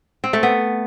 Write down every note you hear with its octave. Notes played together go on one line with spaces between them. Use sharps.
C4
A3
B3